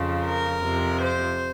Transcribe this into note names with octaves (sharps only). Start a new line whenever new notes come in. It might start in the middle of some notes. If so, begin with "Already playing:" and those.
Already playing: F2 C#3 F3
A#4
F2 C3 F3
C5